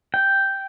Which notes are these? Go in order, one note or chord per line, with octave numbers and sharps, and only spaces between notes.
G5